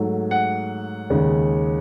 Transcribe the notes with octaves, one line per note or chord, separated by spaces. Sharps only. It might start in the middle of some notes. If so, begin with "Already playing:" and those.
Already playing: G#2 F#3 A3
F#5
D#2 C#3 G#3